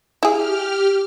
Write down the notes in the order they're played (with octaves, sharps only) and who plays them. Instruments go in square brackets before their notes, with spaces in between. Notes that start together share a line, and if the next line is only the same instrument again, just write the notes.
[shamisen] E4 G#4 [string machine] G4 F6